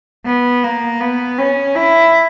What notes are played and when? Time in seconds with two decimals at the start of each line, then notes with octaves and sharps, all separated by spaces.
0.26 B3
0.64 A#3
1.01 B3
1.39 C#4
1.75 E4